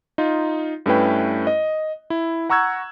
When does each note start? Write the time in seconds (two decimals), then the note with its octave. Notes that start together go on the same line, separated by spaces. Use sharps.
0.18 D#4 F4
0.86 G2 A3 C#4 E4 B4 G5
1.47 D#5
2.10 E4
2.49 F#5 A#5 C#6 E6 F#6 G#6